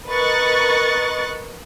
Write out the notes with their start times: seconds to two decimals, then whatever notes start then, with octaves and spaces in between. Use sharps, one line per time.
0.11 A#4 B4 D#5 C#6 F#6 A6